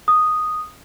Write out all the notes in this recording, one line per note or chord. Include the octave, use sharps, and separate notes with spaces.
D#6